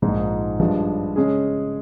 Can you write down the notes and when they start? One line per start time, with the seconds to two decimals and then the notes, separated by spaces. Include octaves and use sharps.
0.02 A#1 G#2 F3 G#3 D#4
0.59 G2 F3 G#3
1.16 C#3 G#3 C#4 G#4